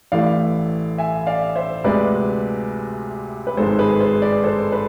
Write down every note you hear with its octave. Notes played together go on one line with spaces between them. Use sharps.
A1 A2 E3 A3 D5 F5
E5 G#5
D5 F5
C5 E5
D2 C3 G#3 B4 D5
B4
G#1 G#2 G#3 A4 C5
G#4 B4
A4 C5
B4 D5
A4 C5
B4